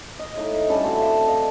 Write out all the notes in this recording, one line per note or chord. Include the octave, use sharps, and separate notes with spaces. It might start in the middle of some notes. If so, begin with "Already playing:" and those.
D#5
A2 D#4
G3 C#4 D4 A4
A3 C4 E4 F#4
E5 F5 A5
D5 D#5 F5